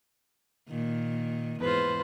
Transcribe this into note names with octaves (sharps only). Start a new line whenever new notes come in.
A#2 D#3
E2 G#2 F4 B4 C5